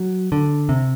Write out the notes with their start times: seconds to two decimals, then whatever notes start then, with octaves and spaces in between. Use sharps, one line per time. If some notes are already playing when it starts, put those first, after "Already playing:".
Already playing: F#3
0.32 D3
0.69 C3